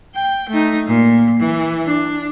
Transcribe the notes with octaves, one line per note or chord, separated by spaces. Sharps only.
G5
A3 D#4
A#2
E3
D4